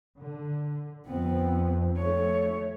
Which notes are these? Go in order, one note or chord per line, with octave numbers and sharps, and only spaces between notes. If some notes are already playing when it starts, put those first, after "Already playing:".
D3
F2 B3 C4
A3 C#5